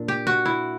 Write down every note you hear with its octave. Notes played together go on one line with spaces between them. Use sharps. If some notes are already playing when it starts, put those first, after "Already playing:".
Already playing: A#2 D4
G4
F#4
E4